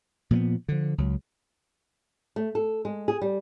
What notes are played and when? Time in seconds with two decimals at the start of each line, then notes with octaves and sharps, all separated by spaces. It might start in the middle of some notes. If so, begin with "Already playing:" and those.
0.31 A#2 F3 G3 B3
0.69 D3 F3
0.98 C#2 F#3
2.36 A3
2.55 A4
2.85 G#3
3.08 G#4
3.22 G3